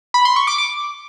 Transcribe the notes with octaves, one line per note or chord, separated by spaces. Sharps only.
B5
C6
C#6
D6
D6